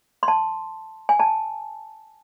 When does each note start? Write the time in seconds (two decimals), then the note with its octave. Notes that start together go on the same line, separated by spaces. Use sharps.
0.23 C6
0.28 A5
1.09 G#5
1.20 A5